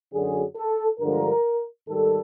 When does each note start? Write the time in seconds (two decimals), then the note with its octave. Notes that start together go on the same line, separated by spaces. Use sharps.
0.12 F#2 D3 F#3 G#4
0.56 A4
0.99 G2 D3 F3 G#3 A#4
1.87 G#2 D#3 G3 A4